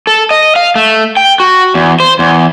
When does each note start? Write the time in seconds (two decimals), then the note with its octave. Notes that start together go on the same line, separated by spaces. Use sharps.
0.07 A4
0.31 D#5
0.56 F5
0.75 A3
1.17 G5
1.40 F#4
1.74 E2
2.00 C5
2.19 E2